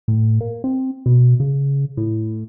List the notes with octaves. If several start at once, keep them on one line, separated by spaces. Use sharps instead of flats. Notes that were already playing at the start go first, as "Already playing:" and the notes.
A2
A#3
C4
B2
C#3
A2